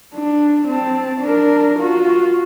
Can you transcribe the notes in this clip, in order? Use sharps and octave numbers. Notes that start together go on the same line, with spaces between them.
D4
C4 A5
D4 A#4
F4 F#4